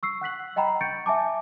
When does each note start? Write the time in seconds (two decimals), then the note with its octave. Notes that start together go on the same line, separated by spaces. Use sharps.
0.03 C#6 E6 C7
0.21 F#5 F#6 B6 F#7
0.56 D#5 F#5 G5 A#5 B5
0.81 C#6 G6 A6 C#7 D7
1.06 E5 G#5 A5 D6